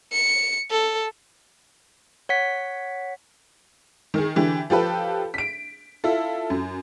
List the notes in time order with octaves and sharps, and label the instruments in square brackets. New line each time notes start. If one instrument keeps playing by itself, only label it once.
[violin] C#7
A4
[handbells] C#5 F#5 B6
[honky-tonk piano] D#3 G#4
D3 E3 G4
F3 G4 A4 B4
B6 D7
E4 F4 A4
F#2